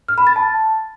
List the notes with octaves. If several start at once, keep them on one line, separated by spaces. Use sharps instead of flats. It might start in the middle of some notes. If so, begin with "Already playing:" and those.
F6
B5
A6
A5